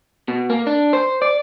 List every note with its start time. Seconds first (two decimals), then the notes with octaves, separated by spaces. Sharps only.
0.28 B2
0.50 A#3
0.67 D4
0.93 C5
1.22 D5